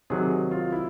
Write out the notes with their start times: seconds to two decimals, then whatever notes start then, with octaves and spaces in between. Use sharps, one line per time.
0.10 C3 D#3 F#3 G#4
0.51 F4
0.72 E4